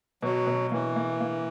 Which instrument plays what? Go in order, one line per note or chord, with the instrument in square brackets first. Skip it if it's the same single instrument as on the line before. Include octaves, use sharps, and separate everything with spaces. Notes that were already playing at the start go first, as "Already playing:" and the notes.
[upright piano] B2 [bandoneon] F#3
[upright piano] B2
[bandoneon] E3 [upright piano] A#3
[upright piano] A#3
A#3